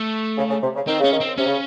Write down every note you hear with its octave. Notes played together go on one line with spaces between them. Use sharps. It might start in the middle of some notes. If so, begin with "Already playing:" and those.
Already playing: A3
C#3
C#3
C3
C#3
D#3 C4
C#3 C#4
D#3
C4
C3 C#4
C#3